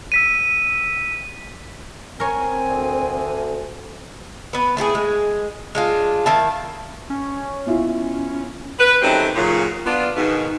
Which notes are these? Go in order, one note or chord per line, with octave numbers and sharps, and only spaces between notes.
E6 B6 D#7
C4 A#4 C#5 G#5
D2
B3 B4
A3 E4 F4 G#4
G#3
G#3 D4 F4
D#3 E4 F5 A5
C#4
B2 E4 F4
B4
D#3 F#3 A3 C4 C#4 G4
A#2 C#3 F#3
B3 D4 F4
G#2 B2 D#3